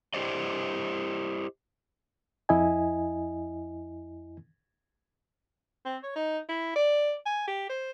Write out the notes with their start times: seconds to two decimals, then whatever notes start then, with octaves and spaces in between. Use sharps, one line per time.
0.14 E4 F4 G4 C5 D5 D#5
2.49 F2 E4 D#5 G#5
5.85 C4
6.03 C#5
6.16 D#4
6.49 E4
6.76 D5
7.26 G#5
7.47 G4
7.69 C5